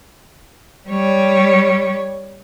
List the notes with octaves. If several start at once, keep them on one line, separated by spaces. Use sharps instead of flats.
G3 C#5